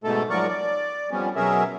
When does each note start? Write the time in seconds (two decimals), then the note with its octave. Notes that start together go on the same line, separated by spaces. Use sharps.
0.04 G#2 B2 A3 A4
0.30 G#2 F3 F#3 A#4 D5 C#6
0.48 D5
1.11 F2 F3 G3 B3 C#4
1.36 B2 F#3 C#4 G#4 A#4 E5